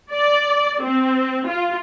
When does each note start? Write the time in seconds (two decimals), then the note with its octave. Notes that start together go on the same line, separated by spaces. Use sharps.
0.11 D5
0.82 C4
1.48 F4